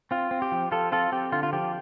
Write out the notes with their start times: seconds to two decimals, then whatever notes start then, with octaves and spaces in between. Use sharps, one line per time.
0.11 C4 F4
0.31 C4
0.42 G4
0.52 F3
0.72 F3 F4 A4
0.92 C4 F4 A4
1.12 C4 G4
1.32 D3 F4
1.43 F4
1.53 F3 G4